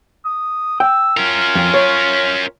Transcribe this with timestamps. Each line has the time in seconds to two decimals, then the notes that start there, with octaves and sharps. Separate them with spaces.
0.25 D#6
0.80 G5 E6
1.17 C#4 F4 A#4
1.55 F2
1.74 C#5